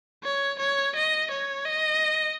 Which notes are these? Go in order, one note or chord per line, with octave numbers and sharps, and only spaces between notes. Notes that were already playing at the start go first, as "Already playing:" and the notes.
C#5
C#5
D#5
C#5
D#5